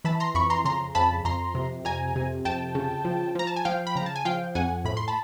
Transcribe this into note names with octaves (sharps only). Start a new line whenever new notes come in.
E3 A5 B5
A#5 C6
F2 B5 C#6
A#5 C6
C#3 A#5 C6
F2 A5 B5
F2 A#5 C6
C3
F2 G#5 A#5
C3
F2 G5 A5
C#3
F3
F3 A#5
A5
G#5
F3 F5 G5
B5
C#3 A#5
A5
G#5
F3 F5 G5
F2 F#5 G#5
A2 B5
C6
A5 B5